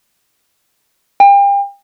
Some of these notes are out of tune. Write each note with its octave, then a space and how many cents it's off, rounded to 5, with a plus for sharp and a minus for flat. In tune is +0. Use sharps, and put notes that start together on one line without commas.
G5 +35